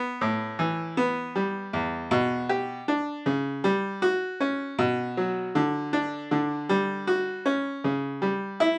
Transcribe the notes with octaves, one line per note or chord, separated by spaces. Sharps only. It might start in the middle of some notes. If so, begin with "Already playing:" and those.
Already playing: B3
A2
E3
B3
G3
E2
B2
G4
D4
C#3
G3
F#4
C#4
B2
F#3
D3
D4
D3
G3
F#4
C#4
C#3
G3
E4